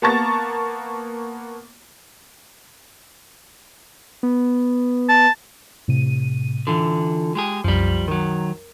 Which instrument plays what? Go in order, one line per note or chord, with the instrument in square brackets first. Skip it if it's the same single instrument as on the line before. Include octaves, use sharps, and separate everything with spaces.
[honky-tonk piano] A#3 B3 A5 A#5 C#6 A6
[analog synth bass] B3
[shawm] A5
[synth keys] A2 C3 D#7
[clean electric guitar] D3 E3 [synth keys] F4
[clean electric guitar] G#3 G4 G#4
[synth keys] C2 F#2 [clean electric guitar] F3 G3
[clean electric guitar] D#3 F#3 [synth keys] A#4